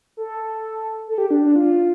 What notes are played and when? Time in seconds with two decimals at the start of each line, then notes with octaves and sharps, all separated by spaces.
0.17 A4
1.08 A4
1.18 G4
1.31 D4
1.42 D4
1.56 F4